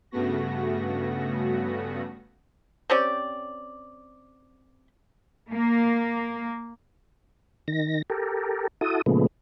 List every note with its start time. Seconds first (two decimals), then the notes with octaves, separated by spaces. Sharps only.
0.11 G2 C#3 A3 B3 F#4 A#6
2.90 C4 C#4 G4 D5
5.48 A#3
7.68 D#3 A#6
8.10 G4 A4 A#4
8.81 E4 F#4 A4 D#6
9.06 A#2 C#3 F3 G#3 A3 B3